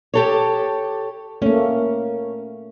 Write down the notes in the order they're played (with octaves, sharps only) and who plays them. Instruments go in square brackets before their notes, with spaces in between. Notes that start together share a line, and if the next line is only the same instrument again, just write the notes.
[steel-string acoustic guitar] G4 A4 C#5
[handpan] A3 A#3 [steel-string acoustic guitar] C#4